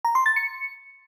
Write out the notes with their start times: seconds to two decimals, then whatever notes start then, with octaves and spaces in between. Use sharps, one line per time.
0.05 A#5
0.15 C6
0.26 A6
0.36 C#7